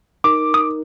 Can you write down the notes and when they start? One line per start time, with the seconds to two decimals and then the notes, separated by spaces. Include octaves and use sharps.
0.24 D#4 A#4 D6
0.54 D#6